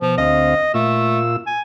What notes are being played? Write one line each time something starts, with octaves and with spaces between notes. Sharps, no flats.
B2 F3
D2 C4 D#5 F5
A#2 A3 F4 E6
G#5